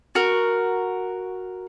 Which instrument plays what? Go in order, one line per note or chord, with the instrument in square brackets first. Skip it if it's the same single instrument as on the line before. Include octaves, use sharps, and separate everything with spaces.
[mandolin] F#4 A#4